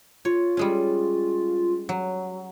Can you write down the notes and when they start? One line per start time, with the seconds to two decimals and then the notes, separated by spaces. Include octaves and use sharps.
0.25 F4 C#5
0.57 G3 G#3 C#4
1.89 F#3